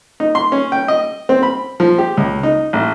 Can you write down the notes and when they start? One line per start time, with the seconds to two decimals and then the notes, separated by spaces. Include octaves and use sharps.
0.20 D#4
0.35 C6
0.52 C#4
0.72 G5
0.88 D#5
1.29 C4
1.43 B5
1.80 F3
1.98 G4
2.17 C#2
2.43 D#4
2.73 A1